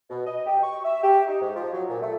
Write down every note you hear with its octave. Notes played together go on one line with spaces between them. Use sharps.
B2
D#5
G4
C#6
E5
G4
D#4
G#2
F3
F#3
A#2
A3